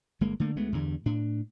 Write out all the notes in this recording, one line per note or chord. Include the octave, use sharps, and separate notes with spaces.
G1 G#3 A#3
D3 A3 A#3
D2 G#3 A3 B3
E2 G2 D3
A2 D4